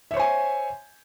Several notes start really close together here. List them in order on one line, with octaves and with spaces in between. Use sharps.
E5 C#5 C5 G#5